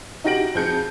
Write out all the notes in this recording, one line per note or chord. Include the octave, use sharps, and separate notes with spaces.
D#4 F#4 G4 A#6 D7 F#7
F2 G#4 G6 C#7